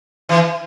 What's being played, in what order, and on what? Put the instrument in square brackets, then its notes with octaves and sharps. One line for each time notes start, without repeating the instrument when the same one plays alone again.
[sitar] E3